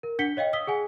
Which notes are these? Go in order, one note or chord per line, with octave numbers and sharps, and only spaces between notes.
A#4
D4 F#5 B6 C#7 G7
C#5 D#5 F5 G5
D#6 E6 B6 G7
G#4 F#5 G#5